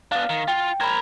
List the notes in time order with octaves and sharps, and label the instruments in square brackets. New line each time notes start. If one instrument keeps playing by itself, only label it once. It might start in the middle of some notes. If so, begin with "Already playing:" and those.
[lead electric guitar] B3 D4 [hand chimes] F5
[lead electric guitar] D#3
[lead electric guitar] F4 [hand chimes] G5
[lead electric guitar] A#4 C5 [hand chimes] B5 G#6